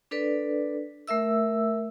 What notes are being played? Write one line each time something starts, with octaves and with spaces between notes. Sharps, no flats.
D4 A4 B4 D5
A3 A#4 E5 E6